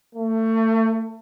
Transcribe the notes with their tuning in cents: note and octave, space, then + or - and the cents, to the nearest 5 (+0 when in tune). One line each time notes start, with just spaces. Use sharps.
A3 +30